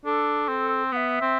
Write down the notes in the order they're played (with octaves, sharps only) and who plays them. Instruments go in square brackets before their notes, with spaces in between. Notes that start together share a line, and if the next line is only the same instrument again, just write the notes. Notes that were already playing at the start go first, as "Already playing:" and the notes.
[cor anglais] D4 [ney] A4
[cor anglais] C4
[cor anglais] B3 [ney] E5 F#5
[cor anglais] C4